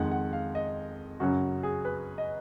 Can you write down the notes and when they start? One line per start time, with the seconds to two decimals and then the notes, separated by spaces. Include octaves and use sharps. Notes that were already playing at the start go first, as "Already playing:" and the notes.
Already playing: F2 D#3 G#3 F#5
0.11 F#5
0.33 F5
0.55 D#5
1.20 F#2 C#3 F#3 F#4
1.63 G#4
1.85 B4
2.18 D#5